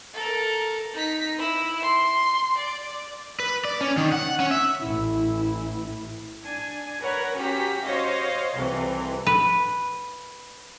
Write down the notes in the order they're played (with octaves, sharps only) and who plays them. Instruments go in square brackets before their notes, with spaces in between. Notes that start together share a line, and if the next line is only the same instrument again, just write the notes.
[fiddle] A4 A#4
[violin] D#4 B6
E4
C6
D5
[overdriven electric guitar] B4
D5
C#4
D#3
F#5
C#4
E5
[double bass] A1 E4
[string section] D4 G#5
A#4 B4 C#5 F#5
C#4 F#4 G4 A#5 B6
F#4 C5 C#5 D#5 F5
C2 F2 C3 E3
[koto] B4